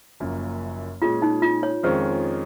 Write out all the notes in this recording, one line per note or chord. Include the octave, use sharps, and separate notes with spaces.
F#1 F#2 F3 A#3
A#2 G#3 C#4 F4 G#4
D#4
F4
C#5
F2 D#3 G#3 C#4 F4 C5